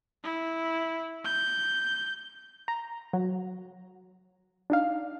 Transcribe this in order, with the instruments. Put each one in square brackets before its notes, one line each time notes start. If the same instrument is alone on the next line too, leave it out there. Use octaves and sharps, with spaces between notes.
[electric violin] E4
G6
[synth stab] A#5
F#3
D4 D#4 F5